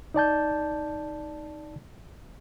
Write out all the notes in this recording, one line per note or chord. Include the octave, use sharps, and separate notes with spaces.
D#4 D5 A5 G6